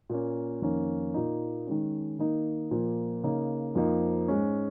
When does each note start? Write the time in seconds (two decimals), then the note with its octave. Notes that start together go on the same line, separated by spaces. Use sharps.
0.09 A#2 A#3 C#4
0.62 F2 D#3 A#3 C#4
1.14 A#2 A#3 D#4
1.67 D#3 G#3 C#4
2.18 D#3 A#3 D#4
2.71 A#2 F3 A#3
3.23 C#3 A#3 D#4
3.75 F2 F3 A#3 D#4
4.28 G#2 G#3 C#4